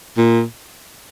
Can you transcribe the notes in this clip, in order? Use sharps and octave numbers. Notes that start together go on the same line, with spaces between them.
A#2